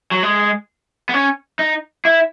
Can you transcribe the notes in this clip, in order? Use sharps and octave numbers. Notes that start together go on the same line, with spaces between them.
F#3
G#3
B3
C#4
D#4
E4